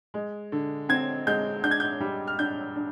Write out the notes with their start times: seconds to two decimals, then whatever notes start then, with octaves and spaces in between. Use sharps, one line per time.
0.14 G#3
0.52 D3
0.89 C4 G#6
1.27 G#3 G6
1.64 D4 G6
1.71 G#6
1.80 G6
2.00 G3
2.27 F6
2.39 D4 G6
2.76 D4